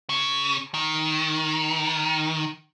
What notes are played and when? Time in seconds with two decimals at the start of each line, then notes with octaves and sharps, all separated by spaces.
0.10 C#3
0.74 D#3